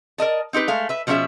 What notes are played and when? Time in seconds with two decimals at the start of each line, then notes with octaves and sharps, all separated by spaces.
0.18 A#4 D5 D#5 A5
0.53 C4 D#4 G4 B4
0.68 G#3 A3 F5
0.89 B4 E5
1.07 B2 F3 G3 C#4 G#4 E5